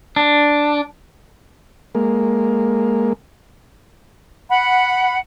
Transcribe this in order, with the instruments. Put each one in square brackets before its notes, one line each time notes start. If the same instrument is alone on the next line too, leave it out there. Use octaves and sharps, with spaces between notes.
[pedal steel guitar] D4
[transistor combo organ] G#3 A#3
[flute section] F#5 B5